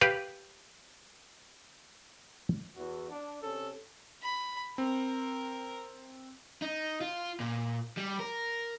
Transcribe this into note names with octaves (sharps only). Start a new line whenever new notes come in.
G4 B4 F5
E2 F#4
D4
C3 C#4 D4 A4
B5
C4 A#4
D#4
F4
A#2
G3
A#4